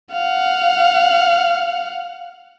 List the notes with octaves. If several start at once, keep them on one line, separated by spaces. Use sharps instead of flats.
F5 F#5